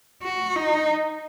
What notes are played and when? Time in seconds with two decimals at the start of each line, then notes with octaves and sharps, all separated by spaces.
0.22 F#4
0.56 D#4